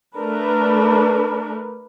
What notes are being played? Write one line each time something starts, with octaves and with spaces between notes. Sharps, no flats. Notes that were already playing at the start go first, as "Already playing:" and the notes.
A3 D4 A#4 B4